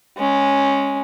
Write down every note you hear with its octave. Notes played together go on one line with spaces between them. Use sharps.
G#3 C#4